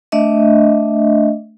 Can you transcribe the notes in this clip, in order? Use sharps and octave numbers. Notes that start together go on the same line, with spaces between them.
A3 D4 D#5 E5